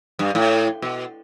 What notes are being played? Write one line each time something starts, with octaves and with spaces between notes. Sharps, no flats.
G2
A2
B2